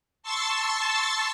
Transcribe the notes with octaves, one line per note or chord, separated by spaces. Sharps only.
A5 C6 C#6 E6 A6